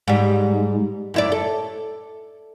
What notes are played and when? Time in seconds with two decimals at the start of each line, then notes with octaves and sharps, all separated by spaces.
0.08 G#2 G3
1.14 F#2 E4 D5
1.32 A4